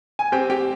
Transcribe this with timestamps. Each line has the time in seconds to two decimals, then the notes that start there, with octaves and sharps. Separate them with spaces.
0.19 G#5
0.32 C4 G4 G5
0.50 G4 G5